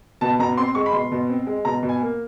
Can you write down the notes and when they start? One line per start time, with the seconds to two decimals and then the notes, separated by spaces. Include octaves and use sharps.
0.21 B2 A5
0.39 B2 A#5
0.58 C4 C6
0.75 G#3 C#6
0.86 B5
0.93 B2 C6
1.12 B2
1.29 C4
1.47 G#3
1.65 B2 A#5
1.83 B2
1.89 G#5
2.02 A#3